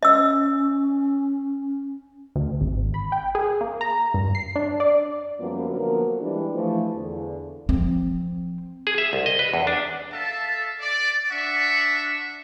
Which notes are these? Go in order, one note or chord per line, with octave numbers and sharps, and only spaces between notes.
C#4 D#5 E6
D2
G#1
B5
G5
G#4
A#3
A#5
G2
C7
D4
D5
F#2 F3 G3 A#3 B3
D3 F3 F#3 A#3 B3 A#4
E3 G3 G#3 D4 E4 G4
E3 F3 A3
E2 D3
F3 C4
G#4
E5
C2
D#5
B4
E2
D4
A4 E5 F5 A5
D5
D4 E5 F#5 C#6